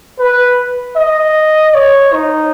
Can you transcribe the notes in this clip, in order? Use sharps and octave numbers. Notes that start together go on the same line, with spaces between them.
B4
D#5
C#5
D#4